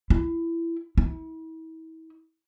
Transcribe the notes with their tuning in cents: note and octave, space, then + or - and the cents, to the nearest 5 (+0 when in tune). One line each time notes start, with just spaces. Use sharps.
E4 +20
E4 -40